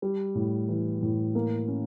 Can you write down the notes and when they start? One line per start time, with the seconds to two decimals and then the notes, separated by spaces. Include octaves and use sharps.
0.02 G3
0.35 A2
0.68 E3
1.02 A2
1.35 A#3
1.68 C#4